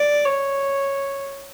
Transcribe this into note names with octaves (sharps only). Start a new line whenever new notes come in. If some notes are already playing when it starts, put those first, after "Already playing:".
Already playing: D5
C#5